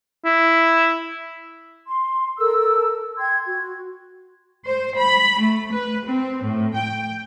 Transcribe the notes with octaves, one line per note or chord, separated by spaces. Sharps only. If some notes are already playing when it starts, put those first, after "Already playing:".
E4
C6
A4 A#4 E6
G5 C6 G#6
F#4
C5
B5
A3
B4
C4
A2
G5